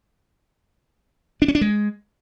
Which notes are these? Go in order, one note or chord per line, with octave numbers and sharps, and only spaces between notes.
D4
C#4
D4
G#3